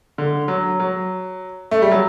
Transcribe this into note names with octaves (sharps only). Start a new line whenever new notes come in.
D3
F#3
F#3
A3
G3
F#3